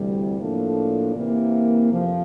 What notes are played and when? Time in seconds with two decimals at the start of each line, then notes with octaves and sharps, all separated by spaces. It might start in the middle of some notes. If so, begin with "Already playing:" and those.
Already playing: D2 C3 E3 G3
0.38 A2 F3 A#3 D4 A4
1.14 C3 E3 A#3
1.91 F2 C3 F3